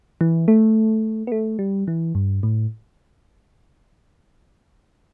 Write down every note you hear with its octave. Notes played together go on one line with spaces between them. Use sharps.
E3
A3
B3
A3
G3
E3
G2
A2